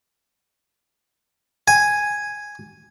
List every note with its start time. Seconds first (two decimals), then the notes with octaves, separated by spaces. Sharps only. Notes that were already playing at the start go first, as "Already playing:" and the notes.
1.68 G#5